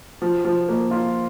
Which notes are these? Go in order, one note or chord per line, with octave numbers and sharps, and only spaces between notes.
F3
F3
A#3
F4